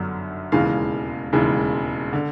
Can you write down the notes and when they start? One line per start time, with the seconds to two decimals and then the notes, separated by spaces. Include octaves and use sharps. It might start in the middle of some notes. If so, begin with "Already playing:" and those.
Already playing: G1 F#2 D3 F#3
0.52 E1 D#2 C#3 E3 G#3 F5
1.33 E1 D#2 C#3 E3 G#3
2.13 D3